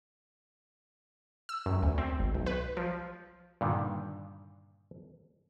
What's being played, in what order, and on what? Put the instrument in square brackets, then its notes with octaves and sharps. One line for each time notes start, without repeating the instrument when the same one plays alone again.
[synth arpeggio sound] E6
F#2
D2
C4
G#1
B1
B4
F3
[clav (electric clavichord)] G2 A#2 D3 D#3